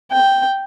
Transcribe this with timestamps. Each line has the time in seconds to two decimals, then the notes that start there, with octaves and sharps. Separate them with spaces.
0.12 G5